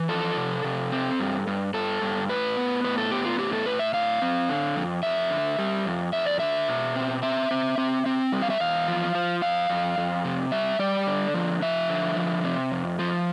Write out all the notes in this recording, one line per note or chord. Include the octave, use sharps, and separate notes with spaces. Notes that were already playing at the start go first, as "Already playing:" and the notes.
Already playing: E3
F3 A4
C3
C3
C4
G2
G2
G2 A4
G2
A2 B4
B3
A2 B4
A4
B3 G4
F4
A2 G4
A4
A2 B4
E5
A2 F5
C4
D3
F2
F2 E5
D3
G3
F2
F2 E5
D5
D3 E5
B2
C4
C4 E5
C4
C4
C4
G3
F5
E5
E2 F5
F3
F3
F2 F5
F2
F2
C3
G3 E5
G3 D5
D3
F3
F3 E5
D3
F3
C3
F2
F3